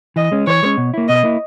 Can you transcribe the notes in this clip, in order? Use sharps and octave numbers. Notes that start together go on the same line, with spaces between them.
E3 D#5
G#3 C#4
E3 C#5
G#3 C#4
B2
A#3 E4
B2 D#5
A#3 E4